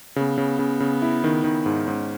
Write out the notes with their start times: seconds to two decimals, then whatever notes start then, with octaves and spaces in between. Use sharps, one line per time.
0.16 C#3 B3
0.38 C#3
0.59 C#3
0.80 C#3
1.02 E4
1.24 D#3
1.44 D#3
1.66 G#2
1.87 G#2 C#4